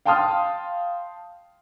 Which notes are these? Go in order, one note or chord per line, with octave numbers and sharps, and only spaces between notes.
F5 G5 A5 C6 D#6 F6